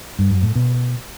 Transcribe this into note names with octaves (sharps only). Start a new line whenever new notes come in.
G2
F#2
A2
B2